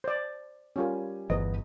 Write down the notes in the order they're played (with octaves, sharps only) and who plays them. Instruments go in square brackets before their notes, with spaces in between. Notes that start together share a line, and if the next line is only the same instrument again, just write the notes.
[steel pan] C5 D5
[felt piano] G3 G4 G#5 [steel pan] C#4 F4 A#4
[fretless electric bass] G1 [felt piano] E2 B3 [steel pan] D#5